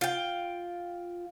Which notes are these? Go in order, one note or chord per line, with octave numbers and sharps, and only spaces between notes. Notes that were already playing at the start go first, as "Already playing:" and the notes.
F4 G5